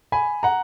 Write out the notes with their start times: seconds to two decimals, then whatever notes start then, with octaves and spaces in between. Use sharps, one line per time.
0.12 G#5 B5
0.43 F#5 A#5